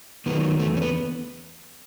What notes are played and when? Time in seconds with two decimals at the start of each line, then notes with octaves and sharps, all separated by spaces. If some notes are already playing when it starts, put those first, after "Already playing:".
0.26 D#3 F#3 B3
0.59 E2 A3
0.77 C#4
0.82 B3